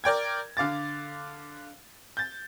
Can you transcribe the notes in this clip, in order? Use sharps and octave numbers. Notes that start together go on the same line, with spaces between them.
A#4 D5 G5 G#6
D3 F5 D6 A6
G6 A6